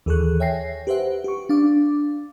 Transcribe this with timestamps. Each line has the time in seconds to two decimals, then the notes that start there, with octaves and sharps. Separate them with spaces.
0.06 D#2 E3 G#4 A4 C#6 F#6
0.40 C#5 E5 G5 G#5 A#6 C7
0.87 G4 B4 C5 E5 F#5
1.24 G4 C#6
1.49 D4 F5 D6